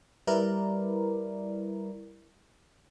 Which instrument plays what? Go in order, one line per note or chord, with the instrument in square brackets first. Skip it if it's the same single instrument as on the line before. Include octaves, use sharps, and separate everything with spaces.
[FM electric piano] G3 E4 A#4 B4 D5